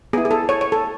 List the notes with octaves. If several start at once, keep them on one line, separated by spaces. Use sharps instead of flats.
B3 E4 G#4
G#4
A4
C#5
C#5
A4